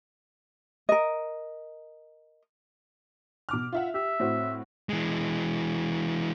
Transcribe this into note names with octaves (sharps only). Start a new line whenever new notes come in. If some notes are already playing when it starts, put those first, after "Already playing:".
A#4 D#5
B2 D6 F6
F4 E5 F#5
G4 E5
A2 C4 F#4
E3 G#3